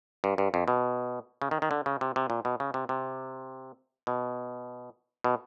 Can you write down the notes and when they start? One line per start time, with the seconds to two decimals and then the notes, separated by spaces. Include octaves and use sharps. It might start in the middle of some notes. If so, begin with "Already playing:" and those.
0.24 G2
0.38 G2
0.54 F2
0.68 B2
1.42 C#3
1.51 D#3
1.62 D#3
1.71 D3
1.86 C#3
2.01 C3
2.16 C3
2.30 A#2
2.45 B2
2.60 C#3
2.74 C3
2.89 C3
4.07 B2
5.24 B2